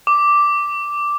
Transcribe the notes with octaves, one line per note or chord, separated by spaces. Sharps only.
D6